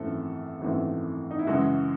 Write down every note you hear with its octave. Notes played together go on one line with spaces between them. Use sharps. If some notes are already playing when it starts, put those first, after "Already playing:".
Already playing: G#1 F#2 E3 A3 C4 A4
G#1 F#2 E3 A3 C4
D#4
E4
F#2 C#3 E3 G#3 F#4